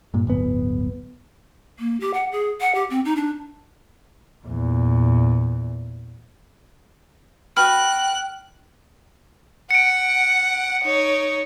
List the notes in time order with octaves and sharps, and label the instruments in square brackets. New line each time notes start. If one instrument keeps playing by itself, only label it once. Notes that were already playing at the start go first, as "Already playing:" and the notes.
[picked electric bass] G2 A#2
D1 G1 B3
[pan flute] A#3
G4
F#5
G#4
F#5
G4
C4
D#4
D4
[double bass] E2 A#2
[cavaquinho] F#4 B4 [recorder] G5 [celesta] F6 [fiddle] F#6
[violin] F#5 [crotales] C#7 D7
[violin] D#4 C#5